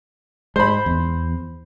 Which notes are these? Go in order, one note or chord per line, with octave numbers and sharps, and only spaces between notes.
G#2 G#3 C5 B5
E2